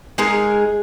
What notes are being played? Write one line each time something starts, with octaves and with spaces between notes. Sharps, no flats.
G#3 D#4 G#4 A#4